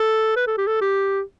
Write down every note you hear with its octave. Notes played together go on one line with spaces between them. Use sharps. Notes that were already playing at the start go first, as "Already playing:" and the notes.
Already playing: A4
B4
A4
G4
A4
G4